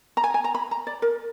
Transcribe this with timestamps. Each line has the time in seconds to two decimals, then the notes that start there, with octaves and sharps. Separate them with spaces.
0.17 A#5
0.24 G#5
0.34 G#5
0.44 A#5
0.55 B5
0.71 A#5
0.87 D5
1.02 A#4